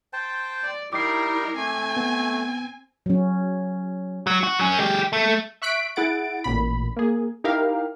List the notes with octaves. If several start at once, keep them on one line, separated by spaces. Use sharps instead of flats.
C5 G5 A5
D5
G3 D#4 E4 G4 A#4 D6 C7
A3 C4 G#5
B3
F#3 C#4
F#3
F#4
F#3 C#4
G#3 G4
A3
E5 C#6 F#6 B6 D7
E4 G#4 F#5 A6 D7
A1 A#2 B5
A#3 G#4
D#4 E4 G4 A#4 F5